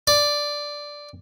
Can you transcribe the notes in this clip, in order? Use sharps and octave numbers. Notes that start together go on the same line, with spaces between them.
D5